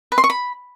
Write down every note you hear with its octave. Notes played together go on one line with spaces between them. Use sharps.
B4
C6
C#6
B5